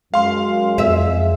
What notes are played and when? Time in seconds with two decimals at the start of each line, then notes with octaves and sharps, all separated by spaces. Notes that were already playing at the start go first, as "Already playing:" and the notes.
0.14 F#2 G#3 F5 C6
0.78 F2 E5